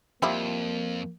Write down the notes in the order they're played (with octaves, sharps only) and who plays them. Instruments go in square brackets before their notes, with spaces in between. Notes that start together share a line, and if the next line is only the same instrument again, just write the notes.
[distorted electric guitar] F2 [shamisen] F3 G3 E4 [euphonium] A#3